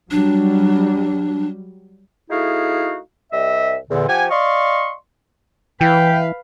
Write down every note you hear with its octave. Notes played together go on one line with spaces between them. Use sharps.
F#3 G3 D4
A3 D#4 E4 F#4 G#4 F5
C2 G3 D#5 E5
E2 A#2 D3
F3 G4 F#5 G#5
D5 D#5 F5 C6 C#6
E3 B4 F5 G5